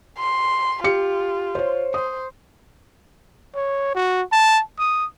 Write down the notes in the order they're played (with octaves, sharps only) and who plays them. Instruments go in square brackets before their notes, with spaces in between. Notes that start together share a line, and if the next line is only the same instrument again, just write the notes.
[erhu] C6
[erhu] F4 [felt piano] G4 C#7
[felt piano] C5 C#5
[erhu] C5 [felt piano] D#6
[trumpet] C#5
F#4
A5
D#6